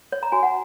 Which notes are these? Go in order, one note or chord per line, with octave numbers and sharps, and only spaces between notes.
C#5
A#5
F#4 G#5
F#5